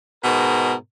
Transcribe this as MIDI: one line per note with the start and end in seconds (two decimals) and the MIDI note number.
0.24 0.75 44
0.24 0.75 47
0.24 0.75 70